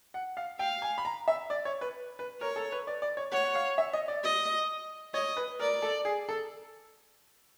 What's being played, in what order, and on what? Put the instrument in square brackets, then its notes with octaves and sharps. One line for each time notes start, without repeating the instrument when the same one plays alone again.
[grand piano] F#5
F5
[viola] F5 [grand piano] G5
[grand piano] G#5
B5
A#5
E5
D5
C#5
B4
B4
[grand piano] A#4 [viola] C#5
[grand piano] A4
B4
D5
D5
C#5
[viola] C#5 [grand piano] F#5
[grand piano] F#5
F5
E5
D#5
D5
[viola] D#5
[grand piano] C#5 [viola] D#5
[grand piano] B4
[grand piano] A#4 [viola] D5
[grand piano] A4
G#4
A4